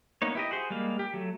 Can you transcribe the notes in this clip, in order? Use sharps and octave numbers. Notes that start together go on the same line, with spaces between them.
A#3 B3 D#4 C#5
E4 G4 D#5
F#4 G#4 C5
G3 G#3 A#3 F5
G4
F#3 A3